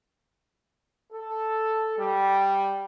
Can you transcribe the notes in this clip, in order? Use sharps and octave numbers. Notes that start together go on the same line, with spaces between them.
A4
G3